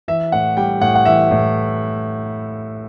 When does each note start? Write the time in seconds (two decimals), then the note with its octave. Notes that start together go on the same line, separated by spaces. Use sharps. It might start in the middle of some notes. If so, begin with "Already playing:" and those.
0.08 E3 E5
0.32 A2 F#5
0.57 G3 G5
0.81 A2 F#5
0.95 F#5
1.05 E3 E5
1.31 A2